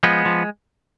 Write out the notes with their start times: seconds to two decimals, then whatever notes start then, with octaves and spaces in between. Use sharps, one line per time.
0.03 F3 G#3 B3
0.26 F3